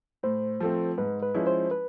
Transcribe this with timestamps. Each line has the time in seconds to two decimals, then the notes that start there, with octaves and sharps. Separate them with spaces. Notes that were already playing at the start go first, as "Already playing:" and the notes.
0.23 A2 C5
0.60 F3 A3 C4
0.98 G#2 B4
1.23 B4
1.34 F3 G#3 C#4 E4
1.47 C5
1.71 B4